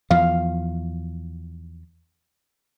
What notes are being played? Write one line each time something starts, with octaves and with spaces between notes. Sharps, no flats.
E2 F3 F5